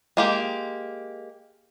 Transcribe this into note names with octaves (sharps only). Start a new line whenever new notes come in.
G#3 A#3 G4